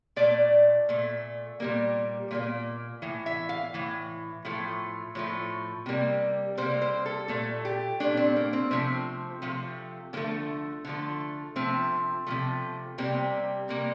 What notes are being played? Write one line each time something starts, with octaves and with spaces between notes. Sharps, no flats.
A#2 A3 D5
A#2 A3
A#2 G3 A#3
A#2 G3 A#3
A2 E3
E5
F5
A2 E3
A2 F3 A3
A2 F3 A3
C3 G3 A#3
C3 G3 A#3 C5
C5
A4
A#2 A3 A4
G4
A#2 A3 D4
C4
A#3
C4
C3 F3 A3 C4
C3 F3 A3
D3 F3 A3 A#3
D3 F3 A3
C3 F3 A3 C4
C3 F3 A3
C3 G3 A#3 C4
C3 G3 A#3